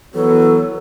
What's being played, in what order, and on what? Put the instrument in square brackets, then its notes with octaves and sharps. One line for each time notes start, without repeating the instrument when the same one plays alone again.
[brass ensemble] E3 F#3 B3 [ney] A4